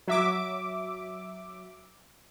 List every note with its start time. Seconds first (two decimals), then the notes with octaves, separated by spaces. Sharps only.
0.07 F#3 E5 D6